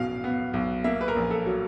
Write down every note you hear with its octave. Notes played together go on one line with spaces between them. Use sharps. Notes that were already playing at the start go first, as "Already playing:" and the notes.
Already playing: B1 B2 F#3 F5
B3
B1
A#3 E5
B4
A#4
A#1
A4
F#3